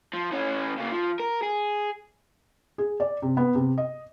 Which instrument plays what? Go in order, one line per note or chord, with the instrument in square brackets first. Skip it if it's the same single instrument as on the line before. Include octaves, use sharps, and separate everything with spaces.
[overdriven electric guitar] F3
E3 C#4
C#3 A#3
F3
A#4
G#4
[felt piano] G#4
D5
C3
B3
C3
D#5